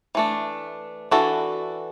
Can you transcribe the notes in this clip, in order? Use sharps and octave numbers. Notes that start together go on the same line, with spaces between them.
E3 A3 D4
E3 D4 F#4 A4